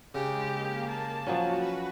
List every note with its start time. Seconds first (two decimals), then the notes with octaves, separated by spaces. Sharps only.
0.15 C#3 G#3 G4
0.53 A#3
0.89 A5
1.27 F3 F#3 C#4 F#4
1.61 B4